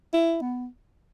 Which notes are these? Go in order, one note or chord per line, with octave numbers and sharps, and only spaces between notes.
E4
B3